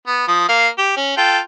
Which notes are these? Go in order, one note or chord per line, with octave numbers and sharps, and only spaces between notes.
B3
F3 D#6
A#3 F5
G4
C#4
F4 A4 G5